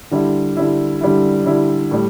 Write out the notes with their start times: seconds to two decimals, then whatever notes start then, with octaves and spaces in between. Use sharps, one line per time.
0.11 D3 G3 E4
0.57 D3 G3 E4
1.01 D3 G3 E4
1.46 D3 G3 E4
1.91 A2 G3